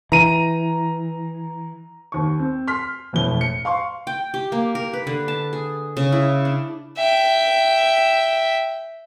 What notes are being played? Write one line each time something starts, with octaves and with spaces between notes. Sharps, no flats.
E3 A#5 D#7
D#2 C#6
C4
C6 F6 B6
E1 F2 A2 G7
C#7
F5 C6 C#6
G5
G4
A#3
A#4
B4
D3
A5
G#4
C#3
E4
D4
E5 G5